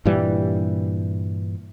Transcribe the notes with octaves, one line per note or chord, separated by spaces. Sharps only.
G2 A#2 E3 G3